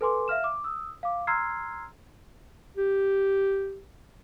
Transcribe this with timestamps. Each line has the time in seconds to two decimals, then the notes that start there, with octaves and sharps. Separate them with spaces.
0.01 A4 B4 G#5 C6 D6
0.28 E5 F5 F6 E7
0.44 D6
0.64 D#6 E6
1.03 F5 D6
1.27 A#5 C6 E6 F6 G#6 C7
2.77 G4